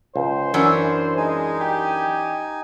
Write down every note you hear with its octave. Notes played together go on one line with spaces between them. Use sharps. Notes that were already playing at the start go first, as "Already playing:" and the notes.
C#2 C5
F#2 E3 C#4 D4
G#3 D#4 G#5
G4